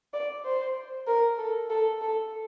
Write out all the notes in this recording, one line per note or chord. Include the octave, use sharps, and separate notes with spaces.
D5
C5
A#4
A4
A4
A4